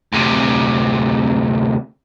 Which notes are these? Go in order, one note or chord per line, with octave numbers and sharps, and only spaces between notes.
D2 C3